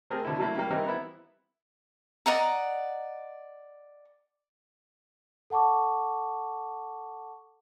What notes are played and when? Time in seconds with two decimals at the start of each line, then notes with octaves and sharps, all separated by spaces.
0.10 A3 C4 G4 G#4 A#4
0.25 B2 D3 E4
0.38 F#3 A3 A#3 E4
0.55 C#3 G3 A#3
0.71 E3 G3 C4 D#4 A#4
0.86 B3 E4
2.26 D5 D#5 F#5 A#5
5.50 A4 F#5 A5 C#6 D6